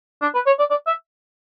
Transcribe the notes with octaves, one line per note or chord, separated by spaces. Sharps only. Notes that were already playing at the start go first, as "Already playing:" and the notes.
D4
B4
C#5
D5
D5
E5